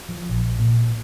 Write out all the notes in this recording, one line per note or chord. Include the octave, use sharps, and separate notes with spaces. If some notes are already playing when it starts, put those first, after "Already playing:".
F3
A#1
A#2